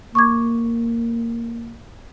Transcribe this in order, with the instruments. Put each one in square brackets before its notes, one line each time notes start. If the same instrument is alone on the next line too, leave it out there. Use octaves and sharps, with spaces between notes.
[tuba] A#3 [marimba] C#6 D6 G#6